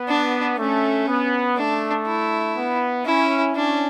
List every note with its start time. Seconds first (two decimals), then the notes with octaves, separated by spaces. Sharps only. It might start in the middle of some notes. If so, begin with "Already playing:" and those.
Already playing: B3
0.09 D4
0.58 A3 C#4
1.08 B3
1.57 A3 D4
2.07 E4
2.56 B3
3.06 C#4 E4
3.55 C#4 D4